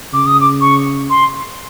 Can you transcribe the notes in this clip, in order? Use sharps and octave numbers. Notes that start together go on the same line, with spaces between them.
C#3 D6
D#6
D6
C#6
C6